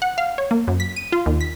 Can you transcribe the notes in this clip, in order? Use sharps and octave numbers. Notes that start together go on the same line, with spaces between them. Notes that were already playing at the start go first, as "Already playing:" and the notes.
F#5
F5
C#5
A#3
F#2
B6
D#7
F4
D#2
B6